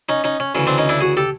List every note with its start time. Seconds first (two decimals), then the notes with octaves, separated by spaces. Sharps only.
0.09 C#4 D#4
0.24 C#4 D#4
0.40 C#4
0.55 D2 C#3 E3 C#4
0.67 C4 D4
0.78 C#4 D#4
0.89 D4 E4
1.01 F#4 G#4
1.17 G4 A4